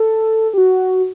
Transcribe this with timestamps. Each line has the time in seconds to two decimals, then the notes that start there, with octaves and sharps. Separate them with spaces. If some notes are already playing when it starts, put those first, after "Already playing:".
Already playing: A4
0.54 G4
0.58 F#4